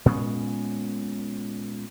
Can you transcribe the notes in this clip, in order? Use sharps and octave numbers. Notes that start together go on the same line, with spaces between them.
A#2 G#3 B3 C#4